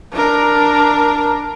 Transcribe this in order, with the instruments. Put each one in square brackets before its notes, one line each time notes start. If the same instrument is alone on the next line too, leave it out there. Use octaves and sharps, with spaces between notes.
[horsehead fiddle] D4 A#4